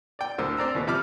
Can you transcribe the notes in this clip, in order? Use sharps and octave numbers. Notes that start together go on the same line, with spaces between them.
D5 G5
D2 D3 A#4 C5 E6
C4 D5 A#5 E6
D#2 A#2 B3
C3 F3 B5 D6 F6